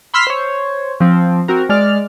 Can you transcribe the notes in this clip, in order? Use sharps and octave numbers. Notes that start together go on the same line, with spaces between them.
B5 C6 E6 F6 B6
C5 C#5
F3 C4
C4 F#4 A#4
G#3 D5 F6